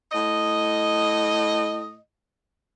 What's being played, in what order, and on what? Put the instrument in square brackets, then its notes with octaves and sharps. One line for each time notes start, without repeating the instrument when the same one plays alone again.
[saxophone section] A2 D#5